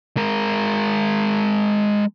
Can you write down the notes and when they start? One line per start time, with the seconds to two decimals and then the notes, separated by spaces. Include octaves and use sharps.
0.17 G#3 A#4